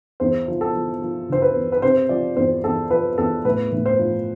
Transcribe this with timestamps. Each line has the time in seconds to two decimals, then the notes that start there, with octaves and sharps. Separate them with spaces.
0.20 E2 C5
0.48 F3
0.61 A4
0.75 F3
1.02 F3
1.29 D3 C5
1.42 B4
1.56 E2
1.72 B4
1.82 C3 C5
2.09 F3 D5
2.37 E2 C5
2.64 E2 A4
2.90 F3 B4
3.18 E2 A4
3.45 A2 B4
3.72 A2
3.86 C5
3.99 F3